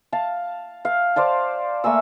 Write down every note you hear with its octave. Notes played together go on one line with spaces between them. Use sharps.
F5 A5
F5
C5 D5 F5 A5
A3 A#3 G#5 E6